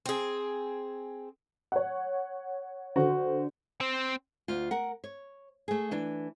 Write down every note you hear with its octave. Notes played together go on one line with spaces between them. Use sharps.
C4 G#4
C#5 F#5
D3 F#4 C5
C4
D2 F4
A#4 F#5
C#5
A3 G#4
E3 D4